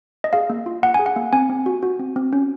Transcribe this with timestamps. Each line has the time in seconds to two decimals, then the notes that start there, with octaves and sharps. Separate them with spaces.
0.24 D#5
0.33 G#4 F5
0.50 A#3
0.66 F4
0.83 A#3 F#5
0.94 G#4 G#5
1.06 F#5
1.16 A#3
1.33 C4 G#5
1.49 C4
1.66 F#4
1.83 F#4
1.99 C4
2.16 C4
2.33 C#4